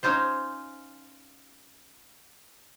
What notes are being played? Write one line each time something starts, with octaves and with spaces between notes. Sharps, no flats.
C#4 D#4 F4 C5